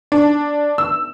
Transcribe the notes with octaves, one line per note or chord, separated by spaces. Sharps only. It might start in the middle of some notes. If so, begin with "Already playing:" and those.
D4
E6